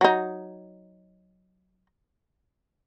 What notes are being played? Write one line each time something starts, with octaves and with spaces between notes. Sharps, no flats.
F#3 D#4